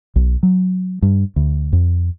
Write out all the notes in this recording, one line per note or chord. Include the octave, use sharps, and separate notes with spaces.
B1
F#3
G2
D2
F2